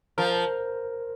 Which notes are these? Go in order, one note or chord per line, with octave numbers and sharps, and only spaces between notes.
F3 A#4